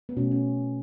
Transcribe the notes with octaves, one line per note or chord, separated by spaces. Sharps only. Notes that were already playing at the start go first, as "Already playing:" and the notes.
B3
B2 A3 C#4
C#4